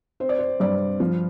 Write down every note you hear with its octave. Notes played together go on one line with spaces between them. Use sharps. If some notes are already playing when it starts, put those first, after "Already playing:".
C4 C5
D5
C5
G2 D5
F3